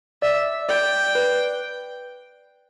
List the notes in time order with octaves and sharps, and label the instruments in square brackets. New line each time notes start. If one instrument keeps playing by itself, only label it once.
[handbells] D5 [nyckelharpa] E5
[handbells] D5 [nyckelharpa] G5
[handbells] B4